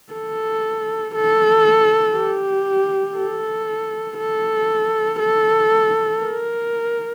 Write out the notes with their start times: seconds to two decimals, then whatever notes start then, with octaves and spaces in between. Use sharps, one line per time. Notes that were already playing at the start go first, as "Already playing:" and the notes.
0.14 A4
1.15 A4
2.16 G4
3.17 A4
4.18 A4
5.20 A4
6.21 A#4